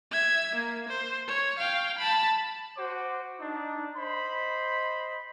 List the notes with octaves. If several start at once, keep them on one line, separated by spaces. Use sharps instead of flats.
E5 G#6
A#3
C5
C#5
F5 G5
A5 B5
F#4 C5 D6
D4 D#4
C5 D#5 B5